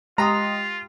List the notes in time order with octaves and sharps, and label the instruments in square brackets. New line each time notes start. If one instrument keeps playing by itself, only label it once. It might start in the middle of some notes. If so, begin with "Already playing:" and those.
[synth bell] G#3 G4 G5 [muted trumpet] F4 [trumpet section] D#5 C6 [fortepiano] A#5 D#6